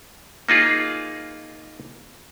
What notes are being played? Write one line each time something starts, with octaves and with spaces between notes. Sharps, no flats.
A#3 D#4 F4 G#4